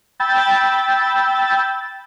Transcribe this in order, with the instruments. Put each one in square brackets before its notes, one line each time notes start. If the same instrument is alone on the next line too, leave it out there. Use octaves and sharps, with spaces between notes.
[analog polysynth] G5 B5 E6 G6 A6